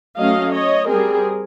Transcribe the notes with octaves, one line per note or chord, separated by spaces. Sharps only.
F#3 A3 C#4 D#5 F5
C#5 D#5
G3 C4 G#4 A#4